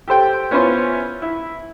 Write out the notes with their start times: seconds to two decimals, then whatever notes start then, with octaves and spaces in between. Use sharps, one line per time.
0.08 G4 A4 C5 G5
0.51 B3 C#4 E4 F4 C5 C#5
1.22 E4